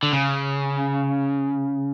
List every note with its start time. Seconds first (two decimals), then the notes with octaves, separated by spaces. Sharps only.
0.03 D3
0.13 C#3